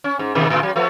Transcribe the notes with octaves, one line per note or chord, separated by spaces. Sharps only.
C#4
G#2
G#2 B2 D#3
A2 D3
F#3
F3 A3 B3